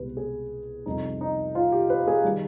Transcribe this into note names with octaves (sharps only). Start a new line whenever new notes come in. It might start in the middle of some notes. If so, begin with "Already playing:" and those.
Already playing: C2 B2 G#3 G4 B4
G#4
F2 C3 G3 D#4
D#4
F4
G4
B4
G#4
D#3 G3